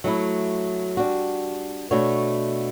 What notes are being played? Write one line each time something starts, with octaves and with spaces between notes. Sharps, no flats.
F#3 A3 E4
G3 D4 F#4
B2 A3 D4 F#4 C#5